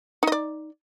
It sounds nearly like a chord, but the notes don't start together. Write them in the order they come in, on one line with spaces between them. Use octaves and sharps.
D#4 D#5 D5